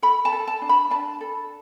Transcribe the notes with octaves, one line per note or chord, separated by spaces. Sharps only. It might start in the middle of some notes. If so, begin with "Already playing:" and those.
A4 B5
A5
A4
A5
D4
B5
D4 A5
A4